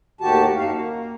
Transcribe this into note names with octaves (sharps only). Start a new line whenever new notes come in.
D#2 A2 D#3 F#4 G4 A5
F#2 D#4 F#4 F5
A#3